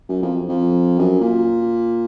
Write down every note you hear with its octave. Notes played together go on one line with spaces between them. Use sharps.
F#2
F2
F2
F#2
A#2